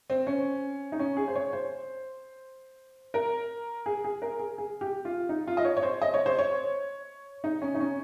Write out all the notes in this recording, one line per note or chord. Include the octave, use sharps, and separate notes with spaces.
C4
C#4
D#4
C#4
G#4
C5
C#5
C5
A#4
G#4
G#4
A#4
G#4
G#4
G4
F4
D#4
F4
D#5
C#5
C#5
C5
D#5
C#5
C5
C#5
D#4
C#4
D#4
C#4